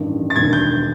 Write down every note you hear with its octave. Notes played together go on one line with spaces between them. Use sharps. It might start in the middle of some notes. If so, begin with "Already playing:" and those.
Already playing: A1 G2 D#3
A6
E1 D#2 D3 G#6
G6